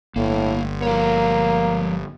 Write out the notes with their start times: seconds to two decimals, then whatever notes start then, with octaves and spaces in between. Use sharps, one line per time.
0.16 G1 A2 A#3
0.82 F3 A#3 C#5